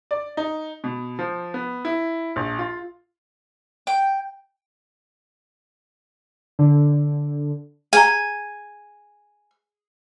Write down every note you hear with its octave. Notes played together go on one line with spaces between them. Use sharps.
D5
D#4
B2
F3
B3
E4
A#1
F4
G5
D3
G#4 G#5 A#5